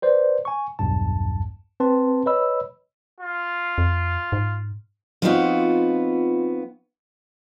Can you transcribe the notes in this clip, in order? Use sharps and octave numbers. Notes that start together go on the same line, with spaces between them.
B4 C5 D5
G#5 C#6
B1 E2 G2 A5
C4 B4 A5 C6
B4 C#5 D#5 B5 E6
F4
F2
G#2
F3 B3 C4 D#4 F4 F#4